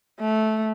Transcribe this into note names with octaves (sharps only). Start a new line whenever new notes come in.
A3